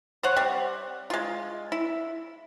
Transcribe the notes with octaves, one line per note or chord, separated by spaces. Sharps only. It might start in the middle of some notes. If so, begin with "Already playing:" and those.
C5 C#5 F#5
G3 C4
G#3 F4
E4